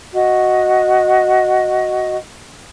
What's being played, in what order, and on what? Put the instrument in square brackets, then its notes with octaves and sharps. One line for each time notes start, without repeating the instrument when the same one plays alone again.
[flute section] F#4 D#5